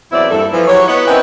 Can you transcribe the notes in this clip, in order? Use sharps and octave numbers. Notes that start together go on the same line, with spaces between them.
E2 F#3 C4 E4 D5 E5
G2 A#3 E4 A4
E3 F3
F#3 E4 G4 C#5
B3 E4 C#5 D#5 F#5
C4 C#4 D#4 E4 A#4 B4